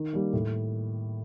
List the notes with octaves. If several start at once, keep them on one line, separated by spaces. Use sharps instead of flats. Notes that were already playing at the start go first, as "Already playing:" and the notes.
Already playing: D#3
G3 A#3
A2